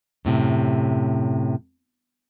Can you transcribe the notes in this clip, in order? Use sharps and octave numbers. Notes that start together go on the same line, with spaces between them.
F#2 A2 C3